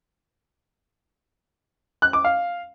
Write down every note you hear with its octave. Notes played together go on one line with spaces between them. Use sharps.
F#6
D6
F5